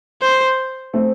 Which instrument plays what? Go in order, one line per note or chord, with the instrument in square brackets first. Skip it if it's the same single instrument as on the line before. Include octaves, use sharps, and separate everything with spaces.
[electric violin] C5
[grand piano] A3 C4